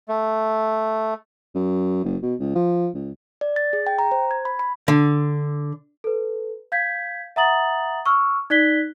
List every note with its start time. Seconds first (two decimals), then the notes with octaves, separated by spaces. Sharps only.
0.08 A3
1.55 F#2
2.04 F#1
2.22 B2
2.40 C#2
2.55 F3
2.94 C#2
3.41 D5
3.56 A6
3.73 G#4
3.86 G5
3.99 A#5
4.12 C5
4.31 G#6
4.45 B5
4.59 B5
4.88 D3
6.04 A4 B4
6.72 F5 G6 G#6 B6
7.36 E5 F#5 A#5 D#6 A6 F#7
8.06 C#6 E6 F6
8.50 D#4 D5 F#6 G#6 B6 G7